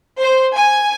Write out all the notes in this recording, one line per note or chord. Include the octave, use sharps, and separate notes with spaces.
C5
G#5